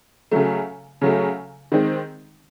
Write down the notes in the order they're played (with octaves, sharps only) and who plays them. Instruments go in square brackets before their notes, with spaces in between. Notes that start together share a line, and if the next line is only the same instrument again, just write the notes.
[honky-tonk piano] C#3 F#3 A3
C#3 F#3 A3
D#3 G#3 C4